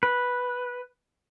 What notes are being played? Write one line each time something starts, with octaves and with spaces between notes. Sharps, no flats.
B4